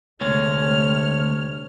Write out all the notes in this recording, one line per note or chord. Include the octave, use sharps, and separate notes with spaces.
D2 C3 G#3 A3 C#5 F6